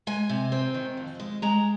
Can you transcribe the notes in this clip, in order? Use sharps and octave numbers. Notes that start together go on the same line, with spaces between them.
G#3 G#5
C3
C4
D#3
F2
G#3
G#3 A#5